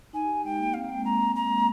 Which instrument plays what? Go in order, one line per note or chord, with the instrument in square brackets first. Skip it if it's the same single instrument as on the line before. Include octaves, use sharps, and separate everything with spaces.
[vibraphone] D#4 [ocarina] G#5
[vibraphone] G4
[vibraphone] G#3 [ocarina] G5
[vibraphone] A#3
[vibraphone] C4 [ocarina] F5
[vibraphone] A#3
[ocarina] G5
[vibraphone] G#3
[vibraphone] G#3 [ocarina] A#5
[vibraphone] A#3
G#3
[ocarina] A#5